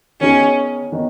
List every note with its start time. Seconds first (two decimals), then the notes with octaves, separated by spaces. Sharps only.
0.21 D#3 B3 C#4 D#4 G#4 C#5
0.92 D#3 B3 D#4 C#5